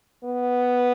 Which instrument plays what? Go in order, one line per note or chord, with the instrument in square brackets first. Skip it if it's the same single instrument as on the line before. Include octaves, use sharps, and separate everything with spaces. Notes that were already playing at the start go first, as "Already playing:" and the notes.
[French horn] B3